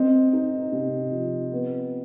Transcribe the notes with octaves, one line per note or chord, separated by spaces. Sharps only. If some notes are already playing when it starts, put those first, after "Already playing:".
Already playing: C4 D#5
D#4
C3
F3
B3